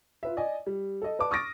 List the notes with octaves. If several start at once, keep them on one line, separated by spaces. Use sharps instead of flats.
F4 B4 E5
D5 D#5 G#5
G3
A4 D#5
B4 D5 A5 D6
C#6 D#6 F6 A6 A#6 D7